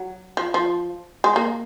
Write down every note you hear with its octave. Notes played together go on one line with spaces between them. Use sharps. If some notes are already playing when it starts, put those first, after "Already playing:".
Already playing: F#3
F3
F3
G#3
A#3